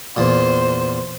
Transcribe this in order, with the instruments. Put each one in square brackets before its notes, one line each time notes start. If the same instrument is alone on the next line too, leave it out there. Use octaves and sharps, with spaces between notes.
[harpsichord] E2 A#2 [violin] C5